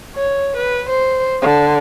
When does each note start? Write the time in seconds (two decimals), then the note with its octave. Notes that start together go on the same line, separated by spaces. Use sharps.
0.16 C#5
0.57 B4
0.90 C5
1.43 D3